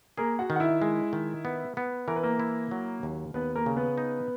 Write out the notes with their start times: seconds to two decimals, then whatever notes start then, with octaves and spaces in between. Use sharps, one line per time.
0.17 A#3 G#4 A#4
0.39 F#4 F#5
0.50 D#3
0.56 F#5
0.60 E4 E5
0.82 G#3
1.13 D#3
1.45 B3
1.77 B3
2.08 E3 A#4
2.16 B4
2.23 A#3 A#4
2.40 E4
2.71 F#3
3.03 D#2
3.34 D#2 B3 B4
3.55 A#3 A#4
3.66 C#3
3.77 B3 B4
3.98 D#4